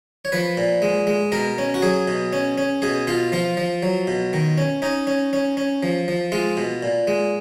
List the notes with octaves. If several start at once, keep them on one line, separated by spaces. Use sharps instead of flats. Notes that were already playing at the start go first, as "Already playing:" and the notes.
C#5
F3 B4
A#2
G#3
G#3
B2 A#4
C#4
F#4
F#3 G#4
B2
C#4
C#4
B2 G#4
B2 F4
F3 F4
F3
F#3
B2
D#3
C#4
C#4 D#4
C#4
C#4
C#4
F3
F3
G#3 F4
B2
A#2
G#3